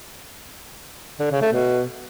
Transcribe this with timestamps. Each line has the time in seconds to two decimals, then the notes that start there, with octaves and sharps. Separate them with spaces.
1.19 D3
1.31 C#3
1.42 A3
1.53 B2